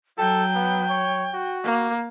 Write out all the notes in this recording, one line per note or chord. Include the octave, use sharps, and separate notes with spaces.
F#3 A4 G5
B3
C#5
F#4
A#3